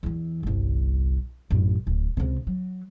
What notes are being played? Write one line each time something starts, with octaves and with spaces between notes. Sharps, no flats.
E2 E3
G1 C2
A1 F#2
D1
C#2 C3
F#3